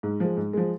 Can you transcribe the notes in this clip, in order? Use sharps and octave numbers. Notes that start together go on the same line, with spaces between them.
G#2
F3 G#3
G#2
F3 G#3